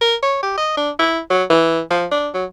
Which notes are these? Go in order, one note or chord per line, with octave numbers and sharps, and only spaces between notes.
A#4
C#5
G4
D#5
D4
E4
F#3
E3
F3
D4
F#3